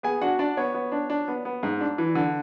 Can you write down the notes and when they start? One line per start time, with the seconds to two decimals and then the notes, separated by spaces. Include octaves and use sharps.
0.03 B3 G#4 G#5
0.21 D4 F#4 F#5
0.39 D4 D5
0.57 B3 C#5
0.74 B3
0.92 D4
1.10 D4
1.28 B3
1.45 B3
1.63 G#2
1.81 D4
1.98 E3
2.15 D3